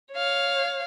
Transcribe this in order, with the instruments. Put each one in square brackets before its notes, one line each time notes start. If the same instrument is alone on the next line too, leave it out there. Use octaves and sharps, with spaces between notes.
[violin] C#5 F5